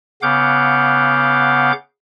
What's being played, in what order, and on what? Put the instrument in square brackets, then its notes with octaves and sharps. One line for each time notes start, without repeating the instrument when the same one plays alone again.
[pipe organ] C#3 B3 F5 F#5 D6 G6